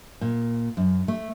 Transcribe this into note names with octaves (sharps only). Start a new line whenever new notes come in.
A#2
F#2
A3